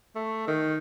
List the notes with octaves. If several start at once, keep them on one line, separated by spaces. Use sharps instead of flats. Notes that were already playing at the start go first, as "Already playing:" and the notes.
A3
D#3